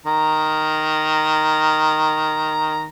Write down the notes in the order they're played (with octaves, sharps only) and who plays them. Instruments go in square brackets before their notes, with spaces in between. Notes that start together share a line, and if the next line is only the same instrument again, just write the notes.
[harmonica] D#3 A#5